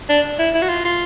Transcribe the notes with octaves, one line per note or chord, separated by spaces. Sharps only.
D4
E4
E4
F#4
F4
F4